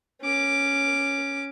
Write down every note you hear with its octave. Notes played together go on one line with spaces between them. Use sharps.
C#4 D6